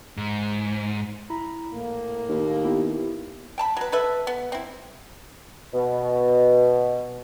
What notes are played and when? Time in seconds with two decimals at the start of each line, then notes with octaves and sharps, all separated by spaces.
0.17 G#2
1.30 E4 A#5 B5
1.73 A#1 A2 A#3
2.29 D#2
2.65 B3 E4 G4
3.58 G5 A5 B5
3.77 F#3 B4
3.92 A4 B4 E5
4.27 B3
4.52 C4 E4
5.74 B2